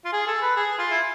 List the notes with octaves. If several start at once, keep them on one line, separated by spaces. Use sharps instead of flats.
F4
G#4
A4
B4
G#4
F4
E4